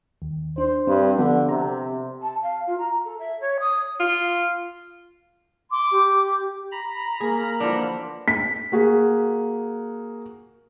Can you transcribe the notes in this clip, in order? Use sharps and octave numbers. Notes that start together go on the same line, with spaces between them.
D#2
D4 C5
G2 C4
D3 F3 B3 F#4
C3 A#5
A5
F5
F4
A#5
A4
E5
C#5
D#6
F4
C6 D6
G4
A#5 B5
A#3 G#4
D3 E3 F3 D4
B6
A#3 F#4 G#4